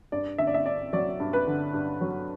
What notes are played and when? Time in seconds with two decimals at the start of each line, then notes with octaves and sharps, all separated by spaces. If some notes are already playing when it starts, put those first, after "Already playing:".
0.12 G2 D5
0.38 D3 E5
0.47 D5
0.54 E5
0.66 G2 D5
0.93 F#3 D5
1.20 G2
1.33 B4
1.47 D3
1.74 G2
2.01 F#3